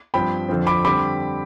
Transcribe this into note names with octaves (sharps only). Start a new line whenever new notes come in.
G2 F3 C4 G5 B5
F2 D3 F3 C4
B5 D6
D3 G3 C4 B5 D6